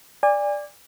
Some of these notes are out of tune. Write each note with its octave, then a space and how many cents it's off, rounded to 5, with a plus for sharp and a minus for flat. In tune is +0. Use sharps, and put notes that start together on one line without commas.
D5 +0 G#5 -35